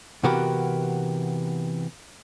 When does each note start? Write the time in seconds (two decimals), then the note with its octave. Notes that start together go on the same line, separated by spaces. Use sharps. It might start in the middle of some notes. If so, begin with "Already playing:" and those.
0.23 C3 E3 B3 F#4 G4 A#4